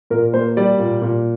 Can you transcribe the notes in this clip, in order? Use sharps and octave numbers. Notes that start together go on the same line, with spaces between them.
A#2 A#4
A#3 C5
G3 D5
A#2
A#2